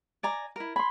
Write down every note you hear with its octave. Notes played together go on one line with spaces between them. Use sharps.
D5 G#5 A#5
E4 A#4
G#5 B5 C6